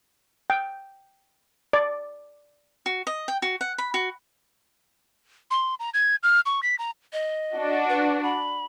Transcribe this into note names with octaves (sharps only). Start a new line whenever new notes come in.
G5
D5
F#4
D#5
G5
F#4
F#5
B5
F#4
C6
A#5
G#6
F6
C#6
B6
A#5
D#5
D4 F#4
B4
B5